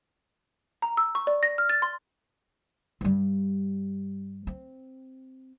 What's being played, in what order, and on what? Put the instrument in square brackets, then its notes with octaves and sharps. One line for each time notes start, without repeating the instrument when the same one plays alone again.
[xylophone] A#5
E6
C#6
D5
A#6
F6
A6
C6
[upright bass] G2 G3
C4